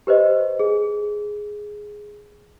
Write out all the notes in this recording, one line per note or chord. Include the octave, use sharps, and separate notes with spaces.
G4 B4 C5 D#5
G#4